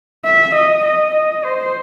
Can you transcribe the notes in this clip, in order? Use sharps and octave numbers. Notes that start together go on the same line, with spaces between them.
E5
D#5
D#5
D#5
C5